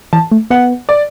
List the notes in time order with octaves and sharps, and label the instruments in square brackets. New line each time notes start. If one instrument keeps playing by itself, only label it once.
[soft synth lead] E3 [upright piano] A5
[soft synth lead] A3
[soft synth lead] B3 [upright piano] F#5
[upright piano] D5